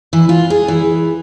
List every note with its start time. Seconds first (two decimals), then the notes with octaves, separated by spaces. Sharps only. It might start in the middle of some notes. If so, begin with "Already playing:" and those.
0.13 E3
0.29 F4
0.50 G#4
0.68 E3